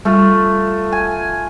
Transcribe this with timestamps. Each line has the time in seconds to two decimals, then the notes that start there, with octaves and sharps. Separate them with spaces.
0.05 G3 A3 F4 A4
0.92 G#5